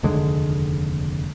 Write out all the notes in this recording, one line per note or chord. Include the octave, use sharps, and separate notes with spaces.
F1 D#2 D3 G#3